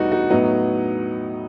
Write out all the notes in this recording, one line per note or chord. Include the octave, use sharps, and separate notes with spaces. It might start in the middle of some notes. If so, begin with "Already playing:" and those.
Already playing: E2 B2 G3 A3 B3 D#4 F#4
D#4 F#4
A2 F#3 B3 D#4